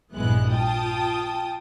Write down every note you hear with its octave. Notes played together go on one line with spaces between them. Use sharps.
A#1 G2 E3 G#3 B3 F#6
F4 G5 A5 D#6